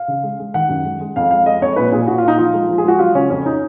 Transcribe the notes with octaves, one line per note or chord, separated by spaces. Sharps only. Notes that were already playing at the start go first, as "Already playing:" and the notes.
Already playing: F5
C#3
G#3
G#3
D#3 F#5
F#2
G#3
G#3
F2 F5
G#3 F5
G#3 D#5
F2 C#5
A#2 B4
A#2 G#4
A#2 F#4
F4
A#2
D#4
F3 F4
G#3
F3
G#4
G#3 F#4
F#3 F4
C#3 C#4
F2 C#4
D#4